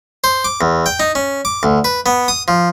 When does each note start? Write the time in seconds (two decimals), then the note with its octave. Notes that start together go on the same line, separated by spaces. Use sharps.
0.24 C5
0.44 D6
0.61 E2
0.86 G5
1.00 D#4
1.15 C#4
1.45 D6
1.63 D2
1.84 B4
2.06 B3
2.28 D#6
2.48 F3